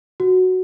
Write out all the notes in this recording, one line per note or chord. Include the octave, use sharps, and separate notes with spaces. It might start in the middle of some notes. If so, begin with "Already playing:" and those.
F#4